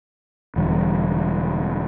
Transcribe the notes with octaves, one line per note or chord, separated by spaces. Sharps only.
E1 E2 D3 G3